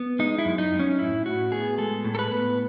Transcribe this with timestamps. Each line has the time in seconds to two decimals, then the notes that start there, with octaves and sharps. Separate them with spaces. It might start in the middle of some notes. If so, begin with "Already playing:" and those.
Already playing: B3
0.19 G#3 D#4
0.38 E4
0.45 F#2
0.58 D#4
0.72 F#2
0.79 C#4
0.98 A2 E4
1.25 A2 F#4
1.52 B3 G#4
1.78 G#3 A4
2.04 A2
2.15 A4
2.19 B4
2.31 B3